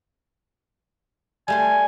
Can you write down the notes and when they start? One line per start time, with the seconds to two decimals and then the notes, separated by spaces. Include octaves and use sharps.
1.48 G3 A3 G#5 C6